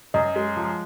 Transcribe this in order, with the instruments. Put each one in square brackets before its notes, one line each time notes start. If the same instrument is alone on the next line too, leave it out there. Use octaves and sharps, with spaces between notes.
[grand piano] F#2 [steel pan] D#5
[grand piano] G#3
F3